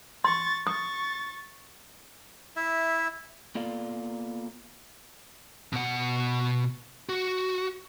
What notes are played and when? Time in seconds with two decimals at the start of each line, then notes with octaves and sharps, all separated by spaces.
0.24 C6 C#6 A6
0.67 C#6 D#6 A6
2.56 E4 E5
3.55 A#3 B3 F4 A4 D5 F5
5.73 B2 F#5
7.09 F#4